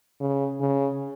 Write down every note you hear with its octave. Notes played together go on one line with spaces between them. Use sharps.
C#3
C#3